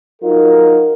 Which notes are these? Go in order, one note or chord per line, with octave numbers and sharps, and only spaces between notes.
F#3 D#4 F4 A#4